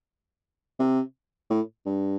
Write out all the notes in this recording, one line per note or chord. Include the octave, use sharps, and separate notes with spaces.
C3
A2
G2